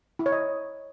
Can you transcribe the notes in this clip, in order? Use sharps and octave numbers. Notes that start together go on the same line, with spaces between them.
E4
C#5
D#5